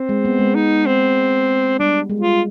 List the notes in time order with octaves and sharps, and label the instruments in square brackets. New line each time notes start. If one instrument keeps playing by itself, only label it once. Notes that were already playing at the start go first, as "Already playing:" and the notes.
Already playing: [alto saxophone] C4
[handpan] G#3
B3
G#3
[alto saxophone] D#4
C4
[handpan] G3 [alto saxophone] D4
[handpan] G#3
[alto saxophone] F4